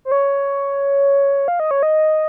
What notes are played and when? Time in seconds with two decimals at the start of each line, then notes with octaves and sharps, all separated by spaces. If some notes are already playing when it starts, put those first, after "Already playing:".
0.05 C5
0.12 C#5
1.48 F5
1.60 D#5
1.71 C#5
1.83 D#5